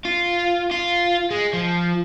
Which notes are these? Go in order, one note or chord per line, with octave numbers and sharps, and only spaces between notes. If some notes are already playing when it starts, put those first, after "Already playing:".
F4
F4
G#3
F3